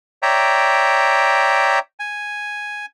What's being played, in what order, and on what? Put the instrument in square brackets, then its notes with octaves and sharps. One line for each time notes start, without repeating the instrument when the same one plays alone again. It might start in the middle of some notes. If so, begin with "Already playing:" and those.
[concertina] C#5 D5 E5 G5 A#5
G#5